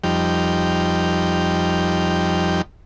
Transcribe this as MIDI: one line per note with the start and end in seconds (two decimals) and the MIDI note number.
0.04 2.62 41
0.04 2.62 53
0.04 2.62 55
0.04 2.62 63
0.04 2.62 79